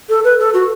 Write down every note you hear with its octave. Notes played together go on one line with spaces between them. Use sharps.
A4
B4
A4
F#4